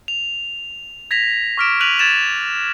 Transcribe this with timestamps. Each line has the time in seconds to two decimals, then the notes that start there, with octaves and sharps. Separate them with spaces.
0.08 F7
1.11 G#6 A#6 B6 F7
1.58 C#6 D6 F6 B6 D7 E7
1.80 F#6 B6 D#7 F7 F#7
1.99 G#6 A6 E7